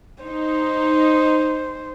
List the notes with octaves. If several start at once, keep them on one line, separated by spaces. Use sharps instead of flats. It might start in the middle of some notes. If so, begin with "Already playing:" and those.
D#4 C5